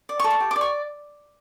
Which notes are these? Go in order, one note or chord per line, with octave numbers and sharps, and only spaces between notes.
D5
C#6
A4
C#6
G4
D6
D5
C#6